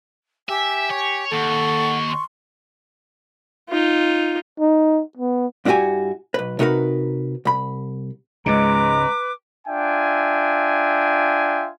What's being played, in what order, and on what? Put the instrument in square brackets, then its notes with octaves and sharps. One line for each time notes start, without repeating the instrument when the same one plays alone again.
[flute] G4 [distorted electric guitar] E5 [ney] G#5
[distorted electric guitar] C#5
[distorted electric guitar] D#2 [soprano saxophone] A4 [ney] F#5 [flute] C#6
[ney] C6
[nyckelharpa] D#4 F4
[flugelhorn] D#4
B3
[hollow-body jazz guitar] G2 D4 E4 F#4 G4 G#5
B1 B4
C3 D#4 F#4 A#4 B4
C2 B5
[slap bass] C#2 G#2 C#3 [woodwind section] G#3 [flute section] B4 D6 [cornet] A#5
[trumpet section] D4 F4 E5 G5 G#5